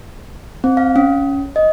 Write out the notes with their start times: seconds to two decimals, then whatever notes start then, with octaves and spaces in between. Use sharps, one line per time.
0.64 C4
0.77 F5
0.96 C#4
1.56 D#5